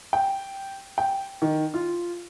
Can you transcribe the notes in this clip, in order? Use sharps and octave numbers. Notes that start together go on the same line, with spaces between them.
G5
G5
D#3
F4